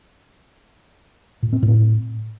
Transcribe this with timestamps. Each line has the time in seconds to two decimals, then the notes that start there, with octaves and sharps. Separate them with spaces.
1.43 A#2
1.53 C4
1.63 A2